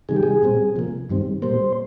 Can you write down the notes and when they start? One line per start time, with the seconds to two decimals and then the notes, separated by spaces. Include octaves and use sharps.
0.09 C3 D#3 G3 G#4
0.16 G4
0.23 G#4
0.42 A#2 G3 C4
0.76 C3 F3 A#3
1.10 G2 D#3 G3 C4
1.42 A#2 G3 A#3 C5